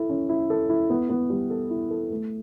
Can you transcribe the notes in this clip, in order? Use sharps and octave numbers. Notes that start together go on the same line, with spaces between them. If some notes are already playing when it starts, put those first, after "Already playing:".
Already playing: E4 A4
C#4
E4
A4
E4
B3
B3
G3
A4
E4
A4
A3